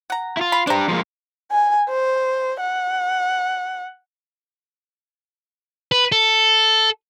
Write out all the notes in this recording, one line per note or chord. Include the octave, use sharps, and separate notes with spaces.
F#5 A#5
E4 F4
B5
D4 G4 C5 A#5
F3 G#3 A#3
G#5
C5
F#5
B4
A4